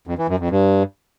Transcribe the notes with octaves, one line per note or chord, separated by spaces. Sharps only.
F2
E3
F#2
F2
G2